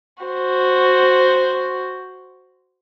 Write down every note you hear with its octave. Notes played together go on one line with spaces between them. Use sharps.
F#4 C5